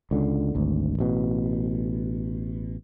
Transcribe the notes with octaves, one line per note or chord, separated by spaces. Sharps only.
C#2 D3
G#1 D2
A1 B2